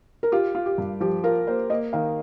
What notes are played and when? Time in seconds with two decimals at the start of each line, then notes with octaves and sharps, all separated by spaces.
0.23 A#4
0.32 F4 G4
0.55 F4
0.66 G4
0.78 G2
1.00 F3 G4
1.24 F4 A#4
1.47 A#3 C5
1.70 A#3 D#5
1.93 D#3 F5